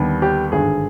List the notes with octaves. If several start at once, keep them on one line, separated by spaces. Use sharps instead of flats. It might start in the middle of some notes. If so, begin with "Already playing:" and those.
Already playing: D#2 D3 G3 B3
G4
G#1 G2 D3 G#4